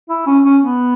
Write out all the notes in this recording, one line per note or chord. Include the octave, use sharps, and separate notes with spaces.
E4
C#4
C#4
B3